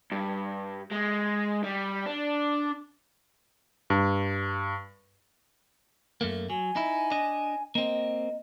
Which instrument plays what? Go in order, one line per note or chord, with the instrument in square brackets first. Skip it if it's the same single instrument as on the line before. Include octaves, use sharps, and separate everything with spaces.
[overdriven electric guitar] G2
G#3
G3
D4
[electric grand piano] G2
[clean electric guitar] F#2 A3 A#3
[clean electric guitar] F#3 [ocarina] G#5
[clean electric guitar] D#4 E4
D4 D#5
[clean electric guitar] A#3 C4 [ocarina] D#5